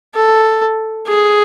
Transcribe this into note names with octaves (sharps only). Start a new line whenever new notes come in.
A4
G#4